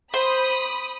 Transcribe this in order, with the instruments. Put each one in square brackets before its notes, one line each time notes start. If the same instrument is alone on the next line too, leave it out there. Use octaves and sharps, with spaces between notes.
[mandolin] C5 [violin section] B5 D#6